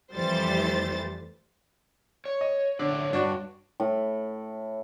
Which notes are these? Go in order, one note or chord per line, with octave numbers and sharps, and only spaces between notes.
F2 E3 G3 A3 C5 A6
C#5
D#5
A2 D3 C#5 D5
G2 D4 F#4 C#5
A2